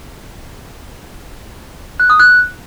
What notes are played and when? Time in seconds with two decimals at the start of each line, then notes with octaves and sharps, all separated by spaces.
2.00 F#6
2.10 D#6
2.20 F#6